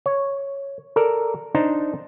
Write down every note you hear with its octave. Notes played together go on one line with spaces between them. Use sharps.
C#5
A4 A#4 D5
D4 D#4 C5 A5 A#5